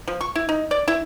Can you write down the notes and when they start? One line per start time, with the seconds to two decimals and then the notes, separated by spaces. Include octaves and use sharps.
0.07 F3
0.21 C#6
0.35 E4
0.49 D#4
0.71 D5
0.88 E4